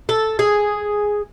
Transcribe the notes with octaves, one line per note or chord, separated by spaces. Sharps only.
A4
G#4